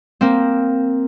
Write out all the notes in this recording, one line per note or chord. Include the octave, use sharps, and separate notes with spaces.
A#3 C4